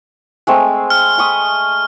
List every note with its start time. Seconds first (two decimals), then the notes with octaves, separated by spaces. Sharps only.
0.47 G#3 A3 C4
0.90 F6
1.18 B5 C#6 D#6